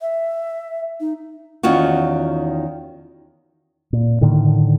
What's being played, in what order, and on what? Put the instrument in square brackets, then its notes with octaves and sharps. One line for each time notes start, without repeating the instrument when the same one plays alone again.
[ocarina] E5
D#4
[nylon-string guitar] E2 D#3 C#4 F4 F#4
[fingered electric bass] A#2
A2 D3 D#3